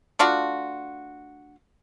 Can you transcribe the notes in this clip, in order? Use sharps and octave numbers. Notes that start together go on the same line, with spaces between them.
A3 D4 F4 F#4